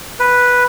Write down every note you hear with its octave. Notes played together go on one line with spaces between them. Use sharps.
B4